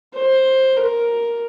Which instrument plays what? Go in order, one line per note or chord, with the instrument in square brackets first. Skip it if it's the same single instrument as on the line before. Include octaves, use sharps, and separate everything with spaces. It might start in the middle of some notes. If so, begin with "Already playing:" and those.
[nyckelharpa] C5
A#4